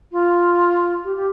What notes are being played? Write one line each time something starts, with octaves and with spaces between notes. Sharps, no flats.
F4
G4
G4